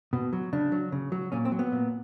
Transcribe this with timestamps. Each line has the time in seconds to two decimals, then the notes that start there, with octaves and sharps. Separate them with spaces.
0.13 B2
0.33 F#3
0.53 C#3 D4
0.72 F#3
0.92 C#3
1.12 F#3
1.32 A#2 C#4
1.45 C4
1.52 F#3
1.59 B3
1.72 A#2